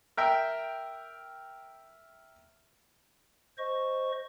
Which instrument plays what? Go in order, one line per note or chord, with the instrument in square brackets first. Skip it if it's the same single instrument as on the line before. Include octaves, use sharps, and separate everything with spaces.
[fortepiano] A#4 E5 G5
[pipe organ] C5 D#5 C#6